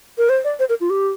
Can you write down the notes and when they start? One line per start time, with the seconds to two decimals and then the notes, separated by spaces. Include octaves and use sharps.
0.18 A#4
0.29 C5
0.44 D5
0.59 C5
0.69 A#4
0.81 F4
0.90 G4